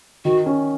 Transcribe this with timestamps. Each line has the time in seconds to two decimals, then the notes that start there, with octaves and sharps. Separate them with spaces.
0.25 D#3 F#4
0.46 C#4